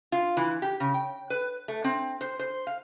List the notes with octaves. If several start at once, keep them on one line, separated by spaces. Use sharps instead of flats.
F4
E3
G4
C#3
G5
B4
A3
C4
C5
C5
F5